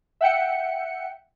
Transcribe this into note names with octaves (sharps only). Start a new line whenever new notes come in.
E5 F#5 G5 C#7